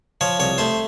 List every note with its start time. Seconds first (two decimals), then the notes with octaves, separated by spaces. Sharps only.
0.21 F3 C#5
0.39 C2 C#5
0.58 A3 C5